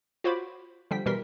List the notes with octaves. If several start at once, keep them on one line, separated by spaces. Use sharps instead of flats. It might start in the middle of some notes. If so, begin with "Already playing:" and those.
F4 F#4 C5 C#5 B5 D6
D3 F3 G3 G5 B6
B2 E3 G3 A#4 C6 B6